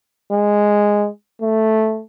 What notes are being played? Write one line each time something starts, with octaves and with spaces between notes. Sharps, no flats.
G#3
A3